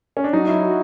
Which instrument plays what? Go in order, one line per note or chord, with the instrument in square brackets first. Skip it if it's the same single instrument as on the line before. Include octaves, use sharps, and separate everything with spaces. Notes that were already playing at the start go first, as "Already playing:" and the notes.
[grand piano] C#4
D4
[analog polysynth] F#3 [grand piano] D#4
[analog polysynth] F#3 [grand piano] E4
[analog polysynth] F#4